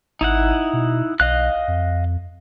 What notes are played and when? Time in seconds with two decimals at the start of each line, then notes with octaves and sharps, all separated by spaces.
0.21 G#1 D#4 E4 F#5
0.73 B2
1.20 B1 D#5 F5 F#6
1.68 F2